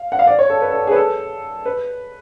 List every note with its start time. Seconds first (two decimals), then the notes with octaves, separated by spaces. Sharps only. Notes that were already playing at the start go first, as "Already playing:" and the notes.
Already playing: F5
0.12 F#5
0.19 F5
0.27 D5
0.39 C#5
0.50 A4
0.62 B4
0.70 A4
0.87 G#4
0.91 B4
0.96 A4
1.65 B4